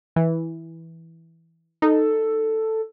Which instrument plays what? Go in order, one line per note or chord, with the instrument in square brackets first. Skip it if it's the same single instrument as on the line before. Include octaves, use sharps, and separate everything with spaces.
[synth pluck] E3
[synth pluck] D#4 [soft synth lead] A4